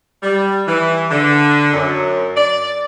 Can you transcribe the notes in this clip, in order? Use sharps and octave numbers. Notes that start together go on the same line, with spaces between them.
G3
E3
D3
F#2
D5